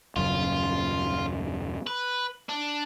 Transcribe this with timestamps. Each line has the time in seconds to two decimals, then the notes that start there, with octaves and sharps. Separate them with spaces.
0.16 D#1 F#2 C#3 F4
1.87 B4
2.49 D4